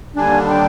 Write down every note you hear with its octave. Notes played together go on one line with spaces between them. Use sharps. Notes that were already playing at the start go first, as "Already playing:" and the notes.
D#2 D3 G3 D4 G#5
G5